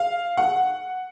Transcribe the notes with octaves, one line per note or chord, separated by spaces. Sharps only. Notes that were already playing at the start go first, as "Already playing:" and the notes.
Already playing: F5
F#5